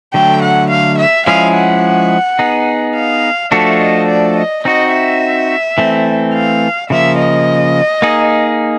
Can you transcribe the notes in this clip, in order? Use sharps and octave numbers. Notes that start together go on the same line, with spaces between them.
D3 F#3 A3 G5
F#5
F5
E5
F3 G#3 C#4 E4 G#4 F5
F#5
B3 D#4 G#4
F5
F3 A3 D4 F#4 A4 E5
D#5
D5
D#5
C4 D#4 F#4 D#5
E5
E3 A3 C4
F5
C#3 F3 A#3 E5
D#5
A#3 D#4 G#4